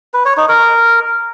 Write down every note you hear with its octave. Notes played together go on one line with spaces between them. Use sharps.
B4
C#5
D#4
A#4